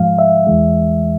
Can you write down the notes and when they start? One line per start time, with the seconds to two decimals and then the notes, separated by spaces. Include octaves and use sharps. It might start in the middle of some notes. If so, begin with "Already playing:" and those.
Already playing: G#2 F3 G#3 F5
0.19 E5
0.47 E2 E3 G#3